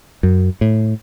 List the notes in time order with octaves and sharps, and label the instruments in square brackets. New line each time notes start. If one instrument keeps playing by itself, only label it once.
[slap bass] F#2
A2